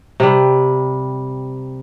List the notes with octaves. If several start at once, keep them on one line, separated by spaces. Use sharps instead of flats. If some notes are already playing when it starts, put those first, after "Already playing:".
C3 G3